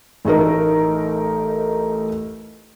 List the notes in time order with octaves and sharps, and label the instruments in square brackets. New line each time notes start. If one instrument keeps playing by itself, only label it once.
[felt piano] A1 A3 D#4 A#4